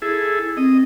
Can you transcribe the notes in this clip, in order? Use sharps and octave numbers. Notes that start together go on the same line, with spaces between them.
E4 G#4 A4
C4 D#5